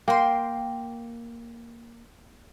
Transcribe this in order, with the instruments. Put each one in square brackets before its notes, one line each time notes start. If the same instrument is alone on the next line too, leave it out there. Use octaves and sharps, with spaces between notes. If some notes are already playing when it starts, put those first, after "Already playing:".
[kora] A#3 [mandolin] G5 C6